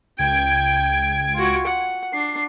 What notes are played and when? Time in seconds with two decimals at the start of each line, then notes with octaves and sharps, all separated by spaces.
0.18 C#2 G5 G#6 D7
1.34 F4 F#4
1.67 F#5
2.13 D4 C7